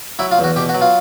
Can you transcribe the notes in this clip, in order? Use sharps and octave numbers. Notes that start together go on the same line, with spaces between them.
F#3 E4
F4
E2
F#4
B2 G4
F#4
F#3
F4